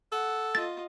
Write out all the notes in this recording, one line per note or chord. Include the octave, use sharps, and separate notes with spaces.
A4 F#5
F4 D#5 A6